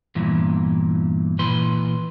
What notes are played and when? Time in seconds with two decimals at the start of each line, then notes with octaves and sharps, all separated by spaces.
0.15 E2 G2 A#2 E3
1.39 A#2 E3 B4 C6